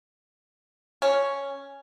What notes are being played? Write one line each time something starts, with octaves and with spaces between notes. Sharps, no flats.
C#4